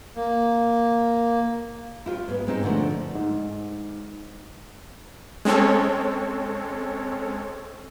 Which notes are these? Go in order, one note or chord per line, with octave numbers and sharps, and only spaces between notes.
A#3
E4 F4 G4 C#5
G#2 B3
G#3 C4 D#4 D#5
A#2 D3 F3 A3
G#2
G#3 C4 C#4 A4 C#5